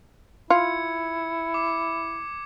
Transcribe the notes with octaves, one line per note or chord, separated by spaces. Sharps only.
E4 F4 G#6 C#7
D6